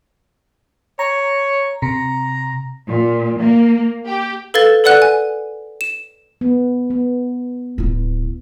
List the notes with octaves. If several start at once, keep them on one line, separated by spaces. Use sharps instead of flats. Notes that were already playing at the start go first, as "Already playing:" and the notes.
C#5 A#5
C3 A#5
A#2
A#3
G4
A4 B4 F5 G#6 A6 G7
A4 B4 D5 F#5 F#6
G#5
E7
B3
B3
D1 E4